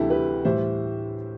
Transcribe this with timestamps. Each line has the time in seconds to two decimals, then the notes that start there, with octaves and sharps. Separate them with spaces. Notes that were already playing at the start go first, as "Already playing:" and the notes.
Already playing: D2 C3 E3 G3 E4 G4 A4
0.10 G4 B4
0.45 A2 E3 G3 C5 E5